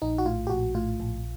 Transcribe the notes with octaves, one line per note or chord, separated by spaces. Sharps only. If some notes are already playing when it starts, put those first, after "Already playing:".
A#1 D#4
F#4
A2 F4
G4
A#1 F#4
A2 F4
A#1